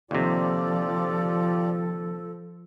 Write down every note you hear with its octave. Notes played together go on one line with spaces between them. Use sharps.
D#2 C3 F3 F4 G4 A4 D5